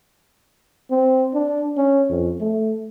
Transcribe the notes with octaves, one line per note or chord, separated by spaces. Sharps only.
C4
D4
C#4
F2
A3